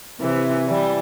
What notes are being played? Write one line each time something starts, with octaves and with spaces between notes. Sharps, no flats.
C3 E3
E3 G3